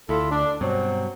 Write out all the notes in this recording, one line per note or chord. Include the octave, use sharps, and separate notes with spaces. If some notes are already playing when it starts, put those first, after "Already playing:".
D2 E4 F4 A4
D4
G2 B2 F#3 C4